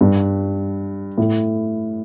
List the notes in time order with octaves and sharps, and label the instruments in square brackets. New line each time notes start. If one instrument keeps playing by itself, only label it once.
[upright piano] G2
A2